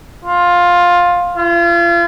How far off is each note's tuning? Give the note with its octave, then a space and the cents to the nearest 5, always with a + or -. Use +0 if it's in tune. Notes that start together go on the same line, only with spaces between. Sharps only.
F4 +10
F4 -35